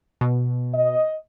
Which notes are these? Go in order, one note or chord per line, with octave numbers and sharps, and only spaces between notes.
B2
D#5